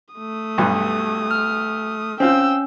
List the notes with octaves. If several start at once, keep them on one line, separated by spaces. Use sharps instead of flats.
A3 D#6
B1 G2 B2
F6
C4 C#4 F4 G5 E6